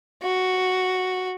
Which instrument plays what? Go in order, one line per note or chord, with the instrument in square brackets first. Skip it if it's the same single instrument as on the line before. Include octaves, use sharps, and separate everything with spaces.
[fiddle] F#4